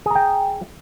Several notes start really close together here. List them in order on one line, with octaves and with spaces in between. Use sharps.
G#4 A#5 G5